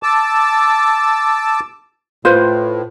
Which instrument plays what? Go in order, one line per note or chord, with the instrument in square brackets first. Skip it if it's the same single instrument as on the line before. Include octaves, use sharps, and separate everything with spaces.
[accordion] A5 D6 E6
[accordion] A2 [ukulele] F4 B4 C5